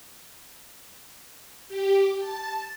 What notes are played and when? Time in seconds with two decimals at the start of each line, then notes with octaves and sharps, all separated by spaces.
1.68 G4
2.19 A5